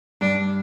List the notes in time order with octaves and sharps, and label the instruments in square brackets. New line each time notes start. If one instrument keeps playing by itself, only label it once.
[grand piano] G2 [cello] D4